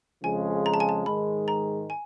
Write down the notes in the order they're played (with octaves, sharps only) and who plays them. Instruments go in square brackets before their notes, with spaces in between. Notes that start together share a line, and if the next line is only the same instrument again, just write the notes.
[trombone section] F2 C#3 F3 G#3 [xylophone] G#5
[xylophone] A#5
A5
G#5
A5
[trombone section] G#2 D#3 G#3 [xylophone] B5
[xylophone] A#5
G#5